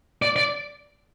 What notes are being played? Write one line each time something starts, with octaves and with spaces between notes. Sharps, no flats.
D5
D5